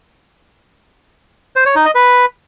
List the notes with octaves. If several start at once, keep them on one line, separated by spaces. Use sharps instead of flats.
C5
C#5
D#4
D#5
B4